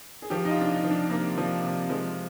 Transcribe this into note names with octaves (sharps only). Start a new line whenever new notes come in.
G#4
F3 G4
D#4
F4
C3 D4
D#4
F3
D4
C3 A#3
F3
C3
F3 G#3